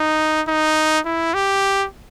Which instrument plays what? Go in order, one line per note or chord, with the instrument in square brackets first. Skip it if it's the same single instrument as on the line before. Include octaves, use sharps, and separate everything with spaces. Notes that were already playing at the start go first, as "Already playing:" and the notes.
Already playing: [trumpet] D#4
D#4
E4
G4